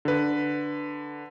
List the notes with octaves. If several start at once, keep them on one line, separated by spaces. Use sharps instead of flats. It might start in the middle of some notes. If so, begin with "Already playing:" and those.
D3 B4